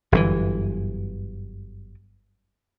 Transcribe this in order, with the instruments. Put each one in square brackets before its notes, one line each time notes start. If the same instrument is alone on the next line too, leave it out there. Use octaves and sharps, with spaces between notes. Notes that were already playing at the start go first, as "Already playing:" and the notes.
[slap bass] G1 F#2 A#2 E3